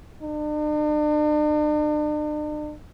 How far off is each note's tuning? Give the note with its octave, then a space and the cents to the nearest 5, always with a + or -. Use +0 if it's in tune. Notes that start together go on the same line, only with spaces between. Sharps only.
D4 +45